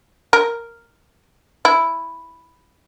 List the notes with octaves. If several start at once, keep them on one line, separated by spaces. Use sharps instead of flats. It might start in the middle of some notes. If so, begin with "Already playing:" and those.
A#4
E4